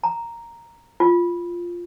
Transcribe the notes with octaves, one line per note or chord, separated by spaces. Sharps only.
A#5
F4